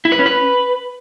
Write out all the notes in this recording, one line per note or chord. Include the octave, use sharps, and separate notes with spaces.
E4
B4
C#4
B4